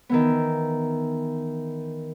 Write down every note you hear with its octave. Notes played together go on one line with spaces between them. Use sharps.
D#3 E3 B3